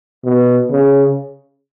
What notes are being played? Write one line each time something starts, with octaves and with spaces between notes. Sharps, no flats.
B2
C#3